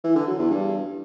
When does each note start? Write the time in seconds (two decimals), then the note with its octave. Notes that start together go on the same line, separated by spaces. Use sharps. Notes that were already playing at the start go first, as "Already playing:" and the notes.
0.04 E3
0.16 D3
0.27 F#3
0.39 E2
0.51 G2